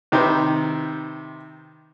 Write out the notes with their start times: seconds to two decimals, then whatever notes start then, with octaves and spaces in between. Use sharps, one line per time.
0.12 C3 D#3 B4 C5